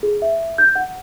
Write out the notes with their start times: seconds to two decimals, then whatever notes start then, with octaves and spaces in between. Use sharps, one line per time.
0.03 G#4
0.22 E5
0.58 G6
0.75 F#5